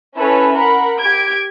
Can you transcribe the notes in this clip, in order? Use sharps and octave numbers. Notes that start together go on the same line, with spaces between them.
C#4 E4 A4 B4 C#5
A#4 F#5 B5
G4 G#6 D7